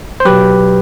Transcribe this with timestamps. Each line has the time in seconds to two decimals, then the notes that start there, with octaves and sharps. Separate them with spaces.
0.20 C5
0.25 B2 F#3 G4 B4